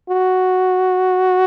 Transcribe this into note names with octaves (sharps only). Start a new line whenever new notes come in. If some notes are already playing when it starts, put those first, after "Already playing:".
F#4